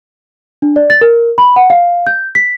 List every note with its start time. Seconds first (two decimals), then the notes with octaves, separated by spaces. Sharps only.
0.62 D4
0.76 D5
0.90 A6
1.01 A#4
1.38 B5
1.56 F#5
1.70 F5
2.07 G6
2.35 B6